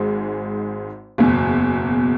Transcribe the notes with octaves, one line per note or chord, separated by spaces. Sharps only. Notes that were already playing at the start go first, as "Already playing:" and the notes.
Already playing: G#1 G#2 G#3
F#1 E2 B2